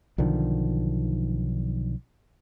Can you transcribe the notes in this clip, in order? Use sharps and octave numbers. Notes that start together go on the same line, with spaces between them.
B1 D3 D#3 F3